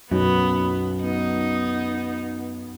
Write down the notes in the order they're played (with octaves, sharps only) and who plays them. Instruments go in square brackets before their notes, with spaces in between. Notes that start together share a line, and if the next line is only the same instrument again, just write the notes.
[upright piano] B1 [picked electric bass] F#2 [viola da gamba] B3
[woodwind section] B3 [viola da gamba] D#4